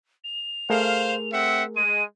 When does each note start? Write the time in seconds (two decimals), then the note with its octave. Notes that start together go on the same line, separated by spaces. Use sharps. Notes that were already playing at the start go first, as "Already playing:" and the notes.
0.24 F7
0.70 A3 G#4 A#4 C5 F5
1.33 C4 E5 F#5 C#7
1.76 G#3 D#7